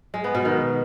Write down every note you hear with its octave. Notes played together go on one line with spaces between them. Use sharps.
G#3
B3
B2
D#3